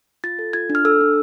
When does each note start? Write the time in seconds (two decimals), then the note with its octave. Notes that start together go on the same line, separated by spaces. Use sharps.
0.24 F4 A6
0.39 A4
0.53 F4 G#6
0.70 D4
0.75 F6
0.85 A4 E6
1.01 D4